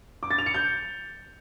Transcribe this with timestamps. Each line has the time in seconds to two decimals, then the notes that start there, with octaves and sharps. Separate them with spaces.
0.23 D6
0.30 A6
0.38 F7
0.46 C#7
0.54 G6